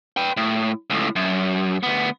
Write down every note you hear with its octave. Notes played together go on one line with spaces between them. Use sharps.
B4 G5
A2
C#2 A2
F#2
D2 B3